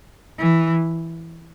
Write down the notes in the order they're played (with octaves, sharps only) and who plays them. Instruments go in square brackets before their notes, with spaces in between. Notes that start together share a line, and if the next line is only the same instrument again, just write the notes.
[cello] E3